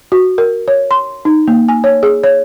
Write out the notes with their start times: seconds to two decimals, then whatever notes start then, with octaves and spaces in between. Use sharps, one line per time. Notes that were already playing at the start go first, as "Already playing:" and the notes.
0.12 F#4
0.38 A#4
0.68 C#5
0.91 C6
1.25 D#4
1.48 A#3
1.69 G#5
1.84 C#5
2.03 G#4
2.24 C#5